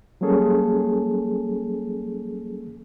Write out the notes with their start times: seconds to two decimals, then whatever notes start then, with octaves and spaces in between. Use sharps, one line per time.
0.21 F#3 G3 A#3 C#4 G#4 A4